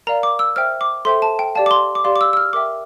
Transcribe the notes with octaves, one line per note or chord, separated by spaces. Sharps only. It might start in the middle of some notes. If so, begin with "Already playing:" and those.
A#4 D5 F5 A#5
D6
E6
C5 E5 G5 F6
D6
A4 C5 E5 G5 C6
A5
G5
G4 D5 F5 A5
D6
C6
D6
G4 D5 F5 C6
D6
E6
E6
F6
A#4 E5 G5 D6